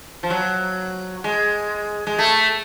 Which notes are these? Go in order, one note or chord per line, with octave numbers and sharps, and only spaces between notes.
F3
F#3
G#3
G#3
A3